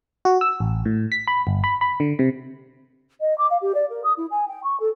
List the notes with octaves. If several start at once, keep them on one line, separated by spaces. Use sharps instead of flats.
F#4
E6
A1
A2
B6
B5
G1
B5
B5
D3
C3
D#5
D6
F5
G4
D5
A#4
D#6
E4
G#5
G5
C#6
A4